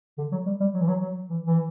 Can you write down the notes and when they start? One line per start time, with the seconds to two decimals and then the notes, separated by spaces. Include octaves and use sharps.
0.18 D3
0.32 F#3
0.46 G3
0.60 G3
0.74 F#3
0.81 E3
0.88 F#3
1.01 F#3
1.30 E3
1.46 E3